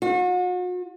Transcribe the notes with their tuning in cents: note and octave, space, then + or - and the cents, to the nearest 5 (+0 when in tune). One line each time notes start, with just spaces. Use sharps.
F#4 -40